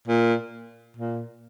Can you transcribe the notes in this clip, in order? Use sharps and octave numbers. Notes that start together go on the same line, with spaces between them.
A#2
A#2